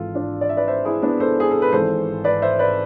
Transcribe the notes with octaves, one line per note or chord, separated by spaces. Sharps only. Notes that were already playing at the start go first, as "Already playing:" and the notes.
Already playing: G#1 G#2 E3 F4 A4
D4 F4
D5
E5
B4 D5
C5 E5
E4 G#4
B3 D4
A4 C5
G#4
A4
B4
G#1 G#2 E3 A4 C5
B4 D5
C5 E5
B4 D5